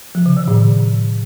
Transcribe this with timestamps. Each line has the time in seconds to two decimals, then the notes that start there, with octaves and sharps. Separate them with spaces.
0.15 F3
0.26 C#3
0.37 D#3
0.48 A2